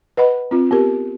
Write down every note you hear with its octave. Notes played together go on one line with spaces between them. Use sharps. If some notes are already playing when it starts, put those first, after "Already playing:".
B4 D#5 F#5 B5
C4 F4
B3 G4 A#4